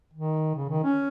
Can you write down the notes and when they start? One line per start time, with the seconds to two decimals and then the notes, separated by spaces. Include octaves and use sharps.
0.13 D#3
0.55 C#3
0.70 D#3
0.84 C#4